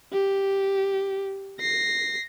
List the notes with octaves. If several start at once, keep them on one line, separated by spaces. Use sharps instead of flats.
G4
A#6 C7